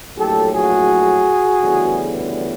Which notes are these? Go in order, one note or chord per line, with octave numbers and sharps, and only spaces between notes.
A#1 A2 F#3 A3 G4 A4
F#4 G#4
D2 C#3 E3 G3 B3